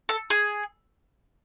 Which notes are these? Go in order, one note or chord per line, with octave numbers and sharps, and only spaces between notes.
A4
G#4